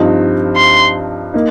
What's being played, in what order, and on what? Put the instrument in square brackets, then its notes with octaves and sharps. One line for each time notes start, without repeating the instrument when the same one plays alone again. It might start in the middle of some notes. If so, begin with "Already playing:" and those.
Already playing: [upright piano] G2 F3 C4 D#4
[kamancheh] C6
[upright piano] A#3 D#4